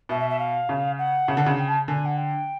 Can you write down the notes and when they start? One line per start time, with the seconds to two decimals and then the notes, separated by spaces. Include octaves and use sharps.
0.09 B2 E5
0.19 E5
0.30 E5
0.39 F5
0.69 C#3
0.98 F#5
1.28 C#3
1.37 D3
1.46 C#3
1.58 G5
1.68 A5
1.88 D3 G#5
2.05 F#5
2.17 G5